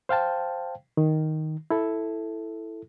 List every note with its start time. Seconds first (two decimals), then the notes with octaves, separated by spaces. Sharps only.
0.09 C5 F5 G5 A5
0.97 D#3
1.70 E4 A4